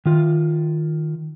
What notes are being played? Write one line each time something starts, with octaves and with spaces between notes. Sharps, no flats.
D#3 F4